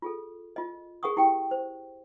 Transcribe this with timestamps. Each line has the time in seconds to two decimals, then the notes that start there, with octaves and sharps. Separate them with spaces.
0.02 F4 G#4 A4
0.56 F4 D#5
1.03 G#4 A#4 F#5 C#6 D#6
1.17 E4 G4 G#4 G5
1.51 C5